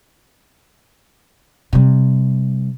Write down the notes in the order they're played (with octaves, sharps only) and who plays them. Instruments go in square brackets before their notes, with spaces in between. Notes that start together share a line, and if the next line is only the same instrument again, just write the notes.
[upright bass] C3 G3